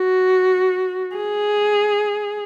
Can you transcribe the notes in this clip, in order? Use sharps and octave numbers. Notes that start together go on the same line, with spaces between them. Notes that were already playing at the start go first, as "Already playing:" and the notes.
Already playing: F#4
G#4